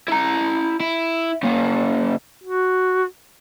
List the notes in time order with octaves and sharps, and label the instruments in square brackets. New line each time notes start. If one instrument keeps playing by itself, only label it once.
[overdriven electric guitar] E4 A#5
E4
C#3 A#3
[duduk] F#4